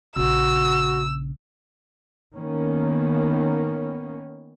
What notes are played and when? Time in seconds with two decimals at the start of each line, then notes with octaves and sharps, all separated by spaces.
0.16 A#1 C#3 F#4 E6
2.34 D#3 A#3 B3 C#4